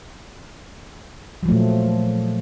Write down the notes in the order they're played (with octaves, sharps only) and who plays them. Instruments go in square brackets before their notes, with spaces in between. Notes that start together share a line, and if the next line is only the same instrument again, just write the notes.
[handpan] F#3
F3
A3
A#2